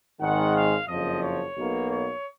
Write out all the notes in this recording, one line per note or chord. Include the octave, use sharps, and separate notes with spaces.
G#1 G#2 D#3 G#3 F#5
F5
F#1 F2 F3 D#5
C#5
B1 B2 A#3
C#5